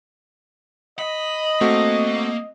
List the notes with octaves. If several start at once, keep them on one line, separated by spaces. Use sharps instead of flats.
D#5 B5
A3 A#3 C4 F#4